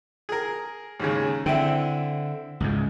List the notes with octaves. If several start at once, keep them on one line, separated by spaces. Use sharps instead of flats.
G#4 A#4
D#2 G#2 C#3
D3 C4 E4
C#2 G#2